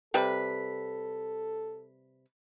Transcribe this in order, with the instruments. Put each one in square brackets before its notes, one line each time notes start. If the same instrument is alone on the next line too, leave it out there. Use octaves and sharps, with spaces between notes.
[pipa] C3 G3 B4 [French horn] A4